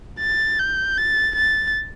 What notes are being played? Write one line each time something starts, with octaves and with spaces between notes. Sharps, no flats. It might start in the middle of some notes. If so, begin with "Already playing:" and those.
A6
G6
A6
A6